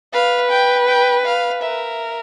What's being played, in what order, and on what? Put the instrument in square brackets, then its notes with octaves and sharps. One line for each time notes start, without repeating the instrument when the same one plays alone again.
[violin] B4 [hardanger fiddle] F5
[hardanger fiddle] G5
G5
F5
[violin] A#4 [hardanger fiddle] E5